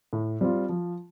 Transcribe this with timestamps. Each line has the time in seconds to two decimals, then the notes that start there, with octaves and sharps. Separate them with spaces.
0.13 A2
0.41 G3 C4 F4
0.69 F3